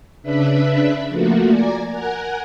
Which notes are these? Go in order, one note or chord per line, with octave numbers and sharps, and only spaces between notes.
C#3 D4 B4 E5 B5
F3 A3 A#3 F#4
D5 G#5 A#5
A#4 F#5 G#5 F#6